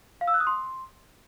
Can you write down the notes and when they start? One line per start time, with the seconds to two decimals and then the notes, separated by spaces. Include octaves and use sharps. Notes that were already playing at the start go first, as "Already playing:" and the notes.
0.21 F5
0.28 E6
0.34 F#6
0.40 D#6
0.47 C6